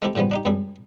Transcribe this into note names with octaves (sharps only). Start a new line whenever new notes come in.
G#3 A3 C4 E4 G4 A4
A2 C#3 F3 G3 B3
D4 D#4 G4
C#2 F#2 G3 G#4 A4